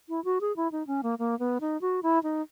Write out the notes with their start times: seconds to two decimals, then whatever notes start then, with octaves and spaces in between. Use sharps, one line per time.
0.09 E4
0.25 F#4
0.41 G#4
0.56 E4
0.72 D#4
0.87 C#4
1.03 A#3
1.19 A#3
1.39 B3
1.61 D#4
1.81 F#4
2.03 E4
2.23 D#4